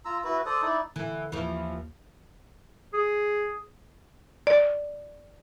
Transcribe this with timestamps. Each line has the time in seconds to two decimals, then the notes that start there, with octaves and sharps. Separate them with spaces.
0.05 F4 A#5 E6
0.24 E4 F#4 B4
0.46 A4 C5 D5 D#6
0.62 D#4 E4 D5
0.96 D3 E3
1.32 D#2 E3 F3
2.93 G#4
4.47 D5